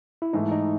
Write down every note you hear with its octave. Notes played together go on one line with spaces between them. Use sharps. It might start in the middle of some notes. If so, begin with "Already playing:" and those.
E4
G#2 E3 A3 D#4
D#4